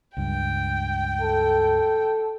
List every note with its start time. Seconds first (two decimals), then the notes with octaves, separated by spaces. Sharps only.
0.17 C#2 G2 G5
1.21 A4